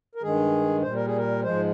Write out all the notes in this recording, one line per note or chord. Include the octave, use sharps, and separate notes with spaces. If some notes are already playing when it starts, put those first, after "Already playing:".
A#4
G2 D#3 G#3 G#4
A#2 G3 C5
A#4
G#4
A#4
G#2 F3 G#3 C5